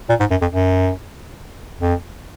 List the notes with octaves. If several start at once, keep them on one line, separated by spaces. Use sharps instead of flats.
A#2
G#2
F#2
F2
F#2
F2